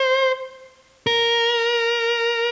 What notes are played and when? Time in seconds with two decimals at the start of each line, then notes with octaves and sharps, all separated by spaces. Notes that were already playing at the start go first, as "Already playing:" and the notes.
Already playing: C5
1.07 A#4